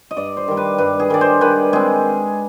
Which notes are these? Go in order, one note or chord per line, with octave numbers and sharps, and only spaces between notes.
D#5
G2 D5
C5
D#3 G3
B4
G2 B4
G#4
D#3 G3 D5
C5
D#3 B4
G#3 C4 G#4